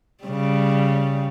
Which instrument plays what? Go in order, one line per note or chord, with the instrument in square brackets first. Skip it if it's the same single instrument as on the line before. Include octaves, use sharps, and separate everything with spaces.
[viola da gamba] C#3 G3